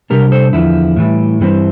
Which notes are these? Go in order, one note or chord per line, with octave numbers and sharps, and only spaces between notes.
C3 G3 D4 G4 A#4
A4 C5
E2 D3 F3 E4
A2 E3 G3
G2 E3 G3 C4